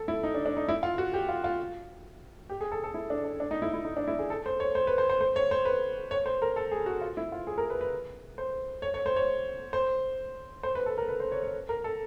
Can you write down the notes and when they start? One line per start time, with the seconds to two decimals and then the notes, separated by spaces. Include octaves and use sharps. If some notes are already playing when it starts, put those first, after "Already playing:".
Already playing: A4
0.08 E4
0.23 D#4
0.34 D4
0.46 D4
0.57 D#4
0.68 E4
0.83 F4
0.98 F#4
1.14 G4
1.29 F4
1.44 F4
2.50 G4
2.61 G#4
2.72 A4
2.84 A4
2.94 E4
3.10 D4
3.25 D4
3.40 D4
3.51 D#4
3.62 E4
3.74 E4
3.85 D#4
3.97 D4
4.07 E4
4.19 G#4
4.30 A4
4.46 C5
4.60 C#5
4.75 C5
4.87 B4
4.98 C5
5.10 C5
5.21 C5
5.36 C#5
5.51 C5
5.65 B4
6.11 C#5
6.26 C5
6.42 A#4
6.56 A4
6.71 G#4
6.86 F#4
7.01 F4
7.17 E4
7.32 F4
7.47 G#4
7.58 A#4
7.70 B4
7.81 B4
8.38 C5
8.82 C#5
8.94 C#5
9.06 C5
9.16 C#5
9.73 C5
10.63 C5
10.75 B4
10.86 A4
10.98 A#4
11.09 B4
11.20 C5
11.32 C#5
11.43 C#5
11.69 A#4
11.84 A4